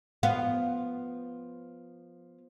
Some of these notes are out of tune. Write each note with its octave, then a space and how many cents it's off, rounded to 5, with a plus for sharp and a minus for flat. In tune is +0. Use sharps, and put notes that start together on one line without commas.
F3 +0 B3 +0 F5 +0